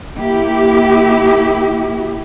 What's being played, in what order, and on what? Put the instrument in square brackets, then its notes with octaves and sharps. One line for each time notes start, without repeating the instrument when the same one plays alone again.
[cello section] A#3 E4 G4